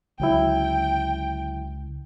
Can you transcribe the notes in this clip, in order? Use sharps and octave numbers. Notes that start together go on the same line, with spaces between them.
C#2 D3 F#3 E4 G5